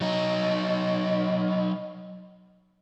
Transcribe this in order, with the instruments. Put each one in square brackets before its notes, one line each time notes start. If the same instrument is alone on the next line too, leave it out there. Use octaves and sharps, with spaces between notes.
[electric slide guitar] F#3 D#4